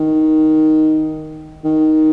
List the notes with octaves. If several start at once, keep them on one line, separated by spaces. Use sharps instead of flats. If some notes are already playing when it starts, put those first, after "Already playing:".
Already playing: D#3
D#3